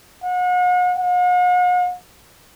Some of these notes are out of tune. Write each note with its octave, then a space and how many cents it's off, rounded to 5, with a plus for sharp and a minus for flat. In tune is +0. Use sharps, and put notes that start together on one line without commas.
F#5 -40
F#5 -45